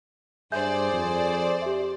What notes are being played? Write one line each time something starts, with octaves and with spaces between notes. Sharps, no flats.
G2 G#4 C5 D5 E5 G6
F2
G4 E5